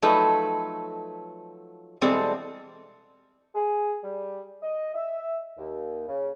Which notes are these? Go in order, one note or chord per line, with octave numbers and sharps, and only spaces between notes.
F3 F#3 A3 D#4 A4 B4
B2 E3 G3 G#3 C4 A4
G#4
G3
D#5
E5
D#2
C#3